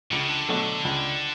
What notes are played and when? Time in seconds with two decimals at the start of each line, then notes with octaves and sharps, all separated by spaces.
0.11 C#2 D3
0.20 C#3
0.28 D3
0.49 B2 F#3 A3
0.85 C#2